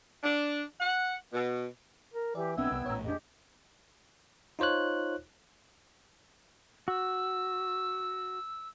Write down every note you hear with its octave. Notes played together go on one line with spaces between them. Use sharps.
D4
F#5
B2
A#4
E3 G4 D5
B1 B3 C4 D4 E5 G5 E6 G#6
C2
A#1 A2 C#5 A#5
F2 D4 G4 G#4 D#5
D#4 F4 C5 C#5 F#6
F#4 E6